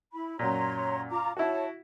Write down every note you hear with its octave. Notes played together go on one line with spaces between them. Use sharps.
E4 B5
F#2 A#2 C#5 A#5 C6
F4 A#5 D6
E4 F#4 C#5 A5